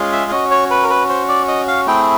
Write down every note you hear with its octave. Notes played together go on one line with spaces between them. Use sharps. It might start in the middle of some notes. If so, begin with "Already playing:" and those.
Already playing: G#3 C#4 F4 G#4
E5
C#4 F#4 D#5
C#5
B4
A#4
B4
C5
D5
D#5
F5
A3 C4 E4 G#4 G5